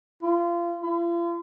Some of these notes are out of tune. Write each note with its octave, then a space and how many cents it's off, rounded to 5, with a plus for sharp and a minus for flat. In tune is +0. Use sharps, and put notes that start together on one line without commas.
F4 -25
F4 -40